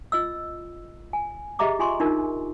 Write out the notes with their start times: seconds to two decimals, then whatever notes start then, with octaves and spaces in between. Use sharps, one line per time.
0.12 F4 D#5 E6
1.13 G#5
1.59 G4 G#4 D#5 E5 A#5 D6
1.79 F4 G#5 C6 C#6
2.00 D4 D#4 F4 A#4